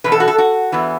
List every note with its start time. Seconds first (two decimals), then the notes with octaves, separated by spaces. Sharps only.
0.04 E2 B2 B3 B4
0.12 A4
0.20 F#4
0.28 A4
0.38 F#4
0.72 E2 E3 B3